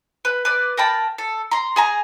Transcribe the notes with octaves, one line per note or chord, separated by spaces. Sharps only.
B4
B4 D5
A#4 G5 A5 B5
A4
A#5 C6
G#4 G#5 A#5